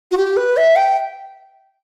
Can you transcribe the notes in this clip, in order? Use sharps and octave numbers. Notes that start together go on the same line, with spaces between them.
F#4
G4
B4
E5
G5